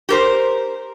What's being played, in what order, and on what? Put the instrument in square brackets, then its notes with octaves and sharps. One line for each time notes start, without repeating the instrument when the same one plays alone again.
[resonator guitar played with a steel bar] G4 A#4 C5